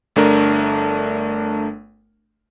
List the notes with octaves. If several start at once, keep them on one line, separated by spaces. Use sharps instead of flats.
G1 A3 D4 A#4